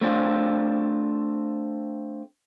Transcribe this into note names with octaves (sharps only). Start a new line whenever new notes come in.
A3 C4 D4 F4